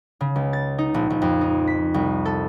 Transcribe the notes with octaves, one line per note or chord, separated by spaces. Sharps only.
C#3
C#2
A6
D#4
A#1
A#1
F2
D#4
B6
C2
A4